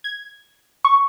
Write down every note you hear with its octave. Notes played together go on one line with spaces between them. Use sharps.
G#6
C#6